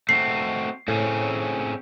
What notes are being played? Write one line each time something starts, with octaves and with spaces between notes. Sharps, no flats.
A3 C4 F#4 C7
A2 C4 C#4 G#4